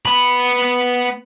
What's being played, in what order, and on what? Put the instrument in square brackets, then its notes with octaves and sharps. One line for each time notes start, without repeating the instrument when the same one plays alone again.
[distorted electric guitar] B3 B5